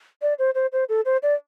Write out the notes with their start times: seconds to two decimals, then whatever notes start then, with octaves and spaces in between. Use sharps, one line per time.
0.22 D5
0.39 C5
0.55 C5
0.72 C5
0.89 A4
1.05 C5
1.23 D5